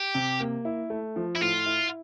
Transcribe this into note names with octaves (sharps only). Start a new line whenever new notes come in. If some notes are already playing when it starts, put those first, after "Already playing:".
Already playing: G4
C3
A#3
E4
A3
F3
E4
A2 F4
E4